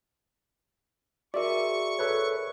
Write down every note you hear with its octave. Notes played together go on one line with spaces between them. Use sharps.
F#4 G#4 A#4 D5 E5 C#6
A4 B4 C#5